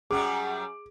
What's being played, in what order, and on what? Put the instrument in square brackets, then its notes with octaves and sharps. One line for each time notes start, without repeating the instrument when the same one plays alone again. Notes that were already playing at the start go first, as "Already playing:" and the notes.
[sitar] F#2 F#3 G3 [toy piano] G#4 [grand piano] D6